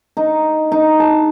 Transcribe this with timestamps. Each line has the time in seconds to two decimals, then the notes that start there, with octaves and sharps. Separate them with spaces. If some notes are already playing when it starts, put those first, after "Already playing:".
0.17 D#4
0.72 D#4
1.00 A5